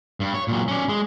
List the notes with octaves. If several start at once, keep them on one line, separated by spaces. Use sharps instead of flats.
G2
C#5
A#2 F#3
C#4 D5
G#3